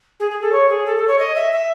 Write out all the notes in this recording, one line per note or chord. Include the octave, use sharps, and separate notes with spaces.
G#4
G#4
A4
C#5
G#4
A4
A4
C#5
D#5
E5
E5